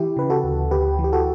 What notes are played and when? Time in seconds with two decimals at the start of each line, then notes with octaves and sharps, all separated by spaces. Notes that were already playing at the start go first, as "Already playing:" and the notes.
Already playing: E3 E4 G4
0.17 C#3 B4
0.30 F#4 A4
0.44 D2
0.71 D2 G4 B4
0.99 E3
1.04 G4
1.13 F#4 A4